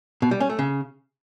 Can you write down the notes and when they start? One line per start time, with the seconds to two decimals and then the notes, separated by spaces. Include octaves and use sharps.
0.22 B2
0.31 G3
0.40 C#4
0.50 A3
0.59 C#3